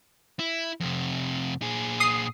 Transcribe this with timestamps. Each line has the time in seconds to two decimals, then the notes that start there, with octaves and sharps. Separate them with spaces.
0.39 E4
0.80 F2 C3
1.62 A#2 G#4
2.00 D#6 C7